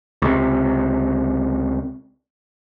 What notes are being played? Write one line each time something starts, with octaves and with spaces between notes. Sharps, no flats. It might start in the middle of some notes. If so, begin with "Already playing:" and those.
C#2 C3